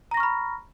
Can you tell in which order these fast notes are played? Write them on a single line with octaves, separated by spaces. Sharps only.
A#5 A#6 C#6 F6 B5